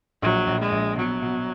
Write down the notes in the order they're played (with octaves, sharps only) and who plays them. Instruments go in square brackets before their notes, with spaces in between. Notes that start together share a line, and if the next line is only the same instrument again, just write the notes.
[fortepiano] A#1 [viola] F#3
[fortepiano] A#1
[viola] G#3
[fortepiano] A#1
[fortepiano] B2 [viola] F#3
[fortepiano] B2